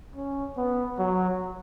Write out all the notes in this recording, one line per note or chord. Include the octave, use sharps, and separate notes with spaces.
C#4
B3
F#3